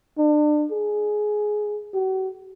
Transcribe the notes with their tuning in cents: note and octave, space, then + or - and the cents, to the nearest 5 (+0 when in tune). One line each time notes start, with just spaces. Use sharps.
D4 +30
G#4 +15
F#4 +40